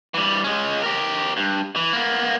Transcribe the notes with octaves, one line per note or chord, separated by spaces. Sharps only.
E3 G3
G#3 C#4
G4 A#4
G2
E3
A#3 B3